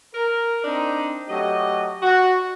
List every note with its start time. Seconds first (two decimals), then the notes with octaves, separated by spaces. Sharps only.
0.15 A#4
0.64 C4 D4 D#4
1.29 F#3 A3 G4 D#5
2.03 F#4